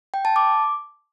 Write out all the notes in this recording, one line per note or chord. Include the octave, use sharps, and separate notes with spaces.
G5
A5
D6